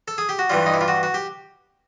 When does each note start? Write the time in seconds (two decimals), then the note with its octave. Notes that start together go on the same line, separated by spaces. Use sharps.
0.08 A4
0.18 G#4
0.29 G4
0.39 F#4
0.49 G2 E3 G3 F4
0.66 D#4
0.74 E4
0.81 F4
0.88 F#4
1.03 F#4
1.14 G4